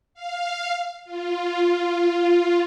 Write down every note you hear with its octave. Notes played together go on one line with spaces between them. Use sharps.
F5
F4